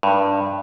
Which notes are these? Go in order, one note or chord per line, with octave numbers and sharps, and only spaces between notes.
G2